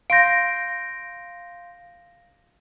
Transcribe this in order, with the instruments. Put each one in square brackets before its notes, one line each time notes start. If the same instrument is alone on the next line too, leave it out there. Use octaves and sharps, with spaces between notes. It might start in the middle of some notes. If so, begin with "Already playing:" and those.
[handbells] F5 C6 G6 [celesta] A#6 D7